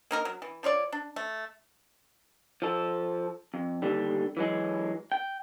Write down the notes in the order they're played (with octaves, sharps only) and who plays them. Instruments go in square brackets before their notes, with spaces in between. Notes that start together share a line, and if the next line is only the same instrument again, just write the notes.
[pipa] A#3 D#4 A#4
F#3
E3
F3 F4 C#5 D5
D4
A3
[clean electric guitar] F3 A4
F2
D#2 D3 G3
E3 F#3 G#3
G5